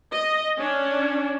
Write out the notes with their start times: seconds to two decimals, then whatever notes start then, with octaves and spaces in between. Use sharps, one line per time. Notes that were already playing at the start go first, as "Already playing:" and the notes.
0.13 D#5
0.59 C#4 D4